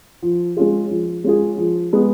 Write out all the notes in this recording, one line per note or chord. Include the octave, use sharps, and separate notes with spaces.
F3
G#3 C#4 F4 G#4
F3
G#3 C#4 F4 G#4
F3
G#3 B3